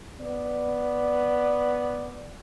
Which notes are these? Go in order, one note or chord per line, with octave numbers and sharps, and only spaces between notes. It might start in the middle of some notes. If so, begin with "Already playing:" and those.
B3 D5